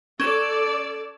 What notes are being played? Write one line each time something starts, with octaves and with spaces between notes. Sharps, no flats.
C#4 A4 D5 E7